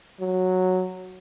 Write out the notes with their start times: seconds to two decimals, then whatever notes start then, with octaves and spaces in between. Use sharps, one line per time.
0.20 F#3